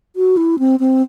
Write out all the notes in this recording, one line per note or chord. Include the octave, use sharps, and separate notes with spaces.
F#4
E4
C4
C4